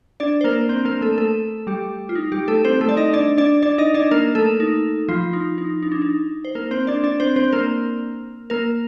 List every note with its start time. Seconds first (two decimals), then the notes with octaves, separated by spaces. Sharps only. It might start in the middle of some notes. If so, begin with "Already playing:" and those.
0.20 D4 D5
0.41 C5
0.44 A#3 A#4
0.69 C4 C5
0.85 A#3 A#4
1.01 A3 A4
1.18 A3 A4
1.67 G3 G4
2.09 F4
2.15 D#4
2.32 G3 G4
2.48 A3 A4
2.65 C4 C5
2.81 A3 A4
2.89 D5
2.97 D#4 D#5
3.13 D4 D5
3.38 D4 D5
3.62 D4 D5
3.78 D#4 D#5
3.94 D4 D5
4.11 A#3 A#4
4.35 A3 A4
4.60 D#4
5.08 F3 F4
5.33 D#4
5.58 D#4
5.83 D#4
5.92 D4
6.02 D#4
6.45 C5
6.55 A#3 A#4
6.71 C4 C5
6.87 D4 D5
7.04 D4 D5
7.20 C4 C5
7.36 C4 C5
7.52 A#3 A#4
8.50 A#3 A#4